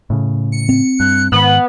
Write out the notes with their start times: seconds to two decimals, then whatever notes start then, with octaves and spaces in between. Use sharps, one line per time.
0.10 A2 C#3
0.52 C#7
0.69 C4
1.00 G2 F#6
1.32 G#2 D#3 B3 F#7